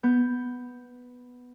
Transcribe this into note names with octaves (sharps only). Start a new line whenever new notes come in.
B3 G6